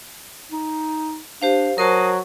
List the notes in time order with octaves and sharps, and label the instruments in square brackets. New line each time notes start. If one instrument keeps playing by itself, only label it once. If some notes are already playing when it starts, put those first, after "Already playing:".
[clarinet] D#4
[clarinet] D4 [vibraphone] G4 C5 F5
[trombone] F#3 [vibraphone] A#4 C5 A5 [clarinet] D#6